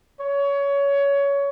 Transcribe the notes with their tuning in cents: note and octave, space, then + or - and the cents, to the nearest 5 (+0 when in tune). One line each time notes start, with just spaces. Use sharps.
C#5 +20